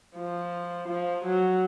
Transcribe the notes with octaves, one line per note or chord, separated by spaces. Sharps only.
F3
F3
F#3